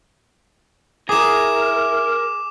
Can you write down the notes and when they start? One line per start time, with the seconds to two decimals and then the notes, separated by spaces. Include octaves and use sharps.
1.09 E4 G#4 A#4 D6 E7